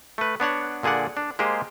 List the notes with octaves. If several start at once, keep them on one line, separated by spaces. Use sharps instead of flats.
A3 B4
B3 D4 C#5 F#5
A#2 D3 G#4 D5 F#5
D4
G#3 A#3 G4 G#4 C5